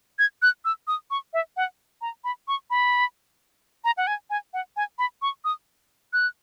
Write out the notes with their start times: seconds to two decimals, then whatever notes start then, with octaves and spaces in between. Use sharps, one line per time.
0.19 G#6
0.42 F#6
0.65 E6
0.88 D#6
1.11 C#6
1.33 E5
1.57 F#5
2.01 A#5
2.24 B5
2.48 C#6
2.70 B5
3.84 A#5
3.97 F#5
4.07 G#5
4.30 G#5
4.54 F#5
4.77 G#5
4.99 B5
5.22 C#6
5.45 D#6
6.13 F#6